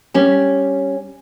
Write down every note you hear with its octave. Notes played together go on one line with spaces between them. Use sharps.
G3 C#4 G4